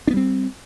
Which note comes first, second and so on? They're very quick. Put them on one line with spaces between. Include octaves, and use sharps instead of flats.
D4 B3 G3 C4